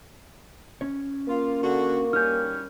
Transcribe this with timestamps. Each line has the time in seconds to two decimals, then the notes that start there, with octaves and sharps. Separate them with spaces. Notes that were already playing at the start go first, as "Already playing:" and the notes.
0.81 C#4 C#5
1.29 A#3 F4
1.63 D3 F#4
2.13 G3 C#4 D#4 G#5 F6 G6